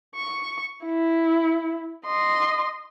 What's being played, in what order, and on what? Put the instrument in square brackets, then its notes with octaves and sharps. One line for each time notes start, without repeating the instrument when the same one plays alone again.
[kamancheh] C#6
E4
D#5 C6